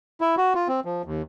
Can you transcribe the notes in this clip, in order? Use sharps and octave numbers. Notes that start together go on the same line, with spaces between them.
E4
F#4
F4
C4
F3
D#2